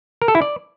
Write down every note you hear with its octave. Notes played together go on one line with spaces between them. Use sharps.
A#4
A4
E4
D5